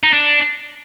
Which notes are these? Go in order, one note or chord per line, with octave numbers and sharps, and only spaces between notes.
D#4
D4